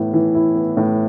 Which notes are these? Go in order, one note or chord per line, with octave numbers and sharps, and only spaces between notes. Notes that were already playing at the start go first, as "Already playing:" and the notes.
Already playing: A2 E3 B3 E4
E3
E4
B3
A2